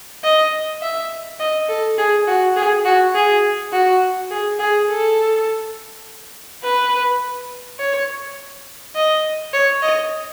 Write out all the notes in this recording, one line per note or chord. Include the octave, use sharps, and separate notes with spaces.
D#5
E5
D#5
A4
G#4
F#4
G#4
F#4
G#4
F#4
G#4
G#4
A4
B4
C#5
D#5
C#5
D#5